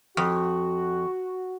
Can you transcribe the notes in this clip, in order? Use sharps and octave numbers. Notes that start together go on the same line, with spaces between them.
F2 F#4